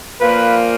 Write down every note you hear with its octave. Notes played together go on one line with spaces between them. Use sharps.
A#2 F3 A#3 B4